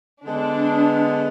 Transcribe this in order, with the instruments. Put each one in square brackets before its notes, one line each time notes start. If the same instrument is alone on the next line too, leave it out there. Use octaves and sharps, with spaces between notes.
[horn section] D3 G#3 B3 [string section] D4